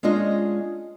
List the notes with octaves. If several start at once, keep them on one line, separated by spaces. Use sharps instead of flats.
G#3 C#4 D4 F4 D#5